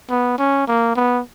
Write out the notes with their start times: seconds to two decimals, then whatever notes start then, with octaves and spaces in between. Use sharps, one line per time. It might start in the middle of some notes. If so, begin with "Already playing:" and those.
0.10 B3
0.39 C#4
0.68 A#3
0.96 B3